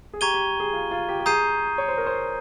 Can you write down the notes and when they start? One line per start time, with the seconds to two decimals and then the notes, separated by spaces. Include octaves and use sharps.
0.13 G#4
0.21 G4 A#5 C#6 G#6 D#7 G7
0.34 G4
0.60 G#4
0.73 F4
0.91 F4
1.08 G4
1.20 G4
1.26 G#4 A#5 D#6 G6 C7 D#7
1.78 C#5
1.88 C5
1.98 A#4
2.06 C5